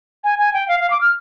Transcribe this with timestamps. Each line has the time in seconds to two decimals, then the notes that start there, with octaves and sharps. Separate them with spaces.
0.24 G#5
0.39 G#5
0.54 G5
0.68 F5
0.80 F5
0.91 D6
1.01 F6